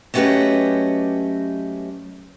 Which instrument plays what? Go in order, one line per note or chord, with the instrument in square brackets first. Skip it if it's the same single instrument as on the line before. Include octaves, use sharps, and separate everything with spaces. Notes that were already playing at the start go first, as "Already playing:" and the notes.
[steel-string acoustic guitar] F#3 A3 C#4 G4 B4 D#5